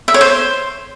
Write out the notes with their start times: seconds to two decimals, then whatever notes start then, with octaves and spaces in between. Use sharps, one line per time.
0.08 E5
0.14 C#5
0.21 C5